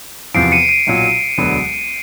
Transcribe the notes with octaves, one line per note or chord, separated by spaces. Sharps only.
E2 C3 F3 C7 D7
C#7 D#7
C#7 D#7
B1 A#2 F#3
E1 D2 D3 F#3 B3